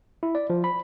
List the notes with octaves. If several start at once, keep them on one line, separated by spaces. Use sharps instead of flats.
E4
D5
F3
B5